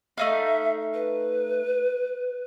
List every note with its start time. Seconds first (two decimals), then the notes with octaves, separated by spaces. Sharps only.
0.18 A3 D#4 E5 F5
0.94 B4